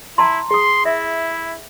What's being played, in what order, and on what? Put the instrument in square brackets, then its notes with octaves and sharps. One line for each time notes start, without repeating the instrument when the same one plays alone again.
[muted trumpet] E4 [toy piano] A5 A#5 C6
[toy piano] G#4 D#6 [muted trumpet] C6
[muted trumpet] E4 [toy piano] E5